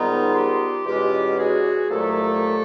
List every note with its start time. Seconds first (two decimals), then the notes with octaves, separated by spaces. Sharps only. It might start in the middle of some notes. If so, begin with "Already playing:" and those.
Already playing: G#2 D#3 G3 B3 D#4 F4
0.34 F4 G4
0.86 E2 B2 G#3 C#4 F4 G4
1.38 F#4 G#4
1.89 C2 A#2 F#3 A3 G4 A4